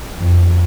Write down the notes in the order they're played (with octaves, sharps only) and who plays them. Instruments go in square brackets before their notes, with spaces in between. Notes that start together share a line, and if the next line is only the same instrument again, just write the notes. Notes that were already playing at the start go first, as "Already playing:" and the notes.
[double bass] F2